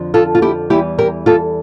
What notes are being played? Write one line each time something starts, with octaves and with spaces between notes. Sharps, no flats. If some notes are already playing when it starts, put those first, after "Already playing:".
Already playing: F2 D3 F3
F4 A4
F4
E4 G4
E2 E3 G3 E4 G4
G4 A#4
F4 A4